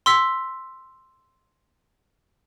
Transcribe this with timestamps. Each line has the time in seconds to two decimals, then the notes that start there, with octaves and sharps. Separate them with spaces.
0.06 C6 E6 B6